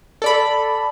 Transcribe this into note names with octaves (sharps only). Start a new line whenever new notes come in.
A4 D5 B5